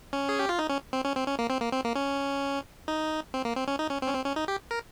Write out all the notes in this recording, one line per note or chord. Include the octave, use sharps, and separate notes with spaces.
C#4
G#4
G4
F4
D#4
C#4
C4
C#4
C4
C#4
A#3
C4
A#3
C4
A#3
C#4
D#4
C4
A#3
C4
C#4
D#4
C#4
C4
C#4
C4
C#4
D#4
G4
A#4